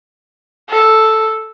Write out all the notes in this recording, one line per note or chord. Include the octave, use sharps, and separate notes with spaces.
A4